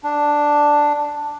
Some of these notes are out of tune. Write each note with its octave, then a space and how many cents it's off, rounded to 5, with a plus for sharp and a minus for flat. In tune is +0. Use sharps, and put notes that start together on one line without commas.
D4 +0